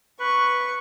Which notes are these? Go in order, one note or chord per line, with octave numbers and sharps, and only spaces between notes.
B4 C#6